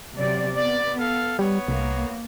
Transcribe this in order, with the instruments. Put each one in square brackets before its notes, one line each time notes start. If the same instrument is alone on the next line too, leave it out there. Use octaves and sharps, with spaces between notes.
[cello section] C3 F#3 D5
[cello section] B3 [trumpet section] D5
[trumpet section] A4 F5
[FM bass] G3 [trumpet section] B3 C#5
[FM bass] C2 [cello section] A#3